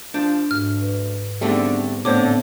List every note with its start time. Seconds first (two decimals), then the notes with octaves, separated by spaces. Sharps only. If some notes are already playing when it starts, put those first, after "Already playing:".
0.14 F3 D4 G6
0.51 D2 G#2 F6
0.81 B4
1.41 D3 G3 A3 B3 C4 D#4 G#4
2.05 A2 D3 B3 C4 C5 C#5 D6